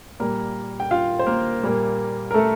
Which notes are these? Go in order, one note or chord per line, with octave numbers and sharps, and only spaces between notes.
A#2 G3 A#3 A#4
G5
F4 F5
C5
A#3 A#4
A#2 G3 A#3
A#4
A3 A4